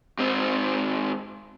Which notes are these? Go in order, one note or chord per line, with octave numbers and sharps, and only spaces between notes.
G#2 C4